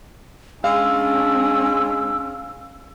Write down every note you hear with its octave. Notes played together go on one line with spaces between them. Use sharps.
G#3 C#4 D4 F5 E6